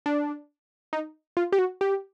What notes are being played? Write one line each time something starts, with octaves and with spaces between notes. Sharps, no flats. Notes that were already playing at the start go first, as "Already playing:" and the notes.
D4
D#4
F4
G4
F#4
G4